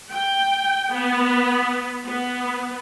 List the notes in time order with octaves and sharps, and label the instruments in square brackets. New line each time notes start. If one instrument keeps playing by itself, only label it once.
[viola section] G5
B3
B3